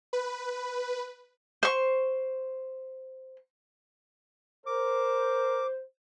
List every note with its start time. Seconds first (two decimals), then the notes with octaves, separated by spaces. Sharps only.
0.13 B4
1.63 C5 C#6
4.66 A#4 C5 D6